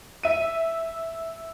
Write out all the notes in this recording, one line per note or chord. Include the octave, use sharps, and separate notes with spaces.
E5 D#7